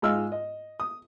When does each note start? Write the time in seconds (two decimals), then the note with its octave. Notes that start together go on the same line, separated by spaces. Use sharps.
0.02 G#2 G#3 F4 D#5 E6 F6
0.32 D#5
0.80 D#6